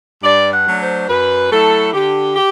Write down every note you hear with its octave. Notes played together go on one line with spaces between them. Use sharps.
G2 D5
F#5
F#3 A3 D4
C5
F#2 B4
F#3 A3 E4 A4
D3 G4
G4